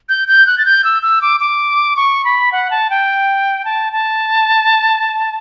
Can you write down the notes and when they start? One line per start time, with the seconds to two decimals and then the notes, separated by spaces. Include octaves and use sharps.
0.09 G6
0.28 G6
0.47 F#6
0.58 A6
0.65 G6
0.84 E6
1.02 E6
1.22 D6
1.40 D6
1.96 C#6
2.25 B5
2.52 F#5
2.71 A5
2.90 G5
3.65 A5
3.93 A5